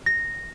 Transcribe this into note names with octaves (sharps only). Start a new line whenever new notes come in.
A#6